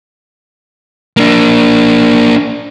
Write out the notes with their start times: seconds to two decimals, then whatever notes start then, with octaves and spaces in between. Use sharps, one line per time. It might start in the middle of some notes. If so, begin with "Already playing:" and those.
1.17 A#3 D4